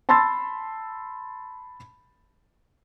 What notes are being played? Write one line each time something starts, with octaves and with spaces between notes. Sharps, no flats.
A5 B5 C6 E6 A6